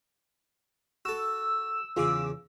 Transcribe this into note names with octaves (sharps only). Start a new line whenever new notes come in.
F#4 A4 E6
E2 C#3 F4 G#4 D6